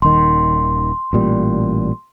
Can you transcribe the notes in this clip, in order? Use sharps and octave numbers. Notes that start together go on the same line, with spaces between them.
D#1 D#3 C6
A1 A#2 G3